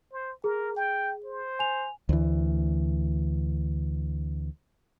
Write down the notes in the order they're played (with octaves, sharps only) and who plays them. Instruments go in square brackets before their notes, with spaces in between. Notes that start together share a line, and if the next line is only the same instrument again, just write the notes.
[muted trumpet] C5
[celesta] G#4 [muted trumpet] A#4
[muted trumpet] G5
C5
[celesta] G#5 F7
[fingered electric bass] D2 E3